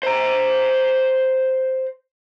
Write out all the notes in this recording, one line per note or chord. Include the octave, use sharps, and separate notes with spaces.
C5 A#5